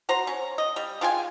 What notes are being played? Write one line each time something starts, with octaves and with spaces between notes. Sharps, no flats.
F#4 C5 A#5
C#4
D#5
G3
G#3 F4 G5 G#5